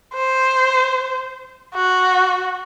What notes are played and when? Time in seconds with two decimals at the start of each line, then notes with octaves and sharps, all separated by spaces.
0.14 C5
1.75 F#4